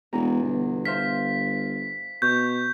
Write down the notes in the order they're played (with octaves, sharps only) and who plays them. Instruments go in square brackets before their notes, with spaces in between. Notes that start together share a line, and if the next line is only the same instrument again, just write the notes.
[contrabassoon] E1 [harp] E2 B2 A#5
[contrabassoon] G1
[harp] C5 E5 F5 [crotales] B6
[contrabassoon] B2 [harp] C#6 [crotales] G6